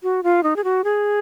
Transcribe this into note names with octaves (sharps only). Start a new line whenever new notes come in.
F#4
F4
D#4
G#4
F#4
G#4